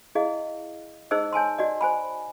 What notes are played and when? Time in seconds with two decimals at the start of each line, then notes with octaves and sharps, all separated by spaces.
0.15 E4 G#4 D#5 F5
1.11 D#4 G#4 C5 D#5 E6
1.33 C#5 G#5 A5 C6
1.58 F#4 D5 D#5
1.81 C5 G#5 B5